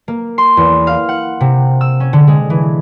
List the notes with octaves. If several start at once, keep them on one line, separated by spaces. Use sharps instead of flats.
A#3
C6
E2
F5
F#5
C3
E6
C#4
D3
G#3
E3